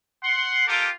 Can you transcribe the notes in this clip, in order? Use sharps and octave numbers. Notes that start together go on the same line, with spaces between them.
F#5 C6
A#3 F4 G4 A4 A#4 D6